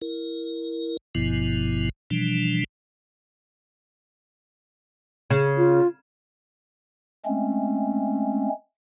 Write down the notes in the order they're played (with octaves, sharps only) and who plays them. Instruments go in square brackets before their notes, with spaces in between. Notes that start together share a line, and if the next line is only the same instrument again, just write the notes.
[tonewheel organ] E4 A#4
G#1 G2 B2 F3 B3 E4
B2 E3 F3 G3 D4
[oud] C#3
[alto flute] F4
[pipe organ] G#3 A3 C4 C#4